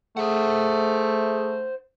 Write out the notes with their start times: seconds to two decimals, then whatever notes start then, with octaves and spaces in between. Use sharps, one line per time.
0.17 A3 G#4 C5 E5 F#5 D#6